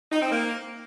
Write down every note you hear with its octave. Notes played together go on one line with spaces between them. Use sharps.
D#4
C4
A#3